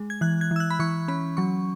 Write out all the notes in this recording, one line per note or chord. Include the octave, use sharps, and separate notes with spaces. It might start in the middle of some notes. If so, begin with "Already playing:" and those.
Already playing: G#3
G#6
E3 F#6
G#6
E3
E6
F#6
B5
E3 C#6
C#4 B5
F#3 C#6